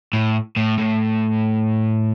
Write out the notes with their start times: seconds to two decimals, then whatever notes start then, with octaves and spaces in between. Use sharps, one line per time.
0.13 A2
0.56 A2
0.78 A2